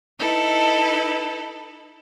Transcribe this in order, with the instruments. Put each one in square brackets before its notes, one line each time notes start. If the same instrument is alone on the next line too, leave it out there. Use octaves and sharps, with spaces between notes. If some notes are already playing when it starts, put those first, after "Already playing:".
[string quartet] D#4 E4 A4 B4